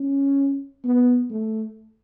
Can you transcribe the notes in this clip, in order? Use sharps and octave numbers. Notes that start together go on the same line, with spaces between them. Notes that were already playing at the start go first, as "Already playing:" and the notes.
Already playing: C#4
B3
A3